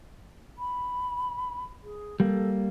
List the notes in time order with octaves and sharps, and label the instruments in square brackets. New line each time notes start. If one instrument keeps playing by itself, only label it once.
[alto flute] B5
G#4
[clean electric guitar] G3 A#3 [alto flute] A4